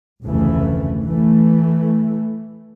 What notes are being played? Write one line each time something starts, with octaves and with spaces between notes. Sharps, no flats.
F1 D2 C#3 E3 A3
E3 A3